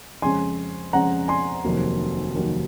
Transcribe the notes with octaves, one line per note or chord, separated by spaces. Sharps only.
F2 C#3 G#3 C#4 G#5 C6
F2 C#3 G#3 C#4 F#5 A#5
G#5 C6
F1 D#2 D#3 F#3 A#3
F1 D#2 D#3 F#3 A#3